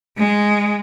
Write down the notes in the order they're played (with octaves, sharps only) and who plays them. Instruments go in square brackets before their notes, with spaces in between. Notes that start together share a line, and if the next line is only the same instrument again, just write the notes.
[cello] G#3